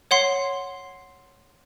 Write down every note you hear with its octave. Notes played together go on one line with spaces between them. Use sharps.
C#5 F#5 C6 C7